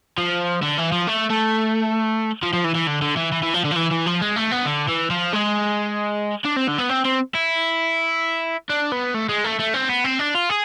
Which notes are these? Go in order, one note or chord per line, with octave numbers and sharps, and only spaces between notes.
F3
D3
E3
F3
A3
A3
F3
F3
E3
E3
D3
D3
E3
E3
E3
F3
D3
F3
E3
E3
F3
G#3
A3
B3
D3
E3
F3
G#3
D4
C4
D3
B3
C4
C4
E4
D4
B3
A3
G#3
A3
A3
C4
B3
C4
D4
F4
G#4